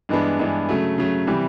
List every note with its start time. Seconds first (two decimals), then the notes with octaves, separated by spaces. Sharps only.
0.09 G2 E3 G#3 B3 D4
0.39 G2 E3 G#3 B3 D4
0.69 C#3 F#3 A3
0.98 C#3 F#3 A3
1.27 C3 E3 G3